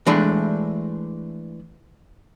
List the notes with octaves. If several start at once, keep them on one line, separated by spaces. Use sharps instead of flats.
E3 G#3 A3 D4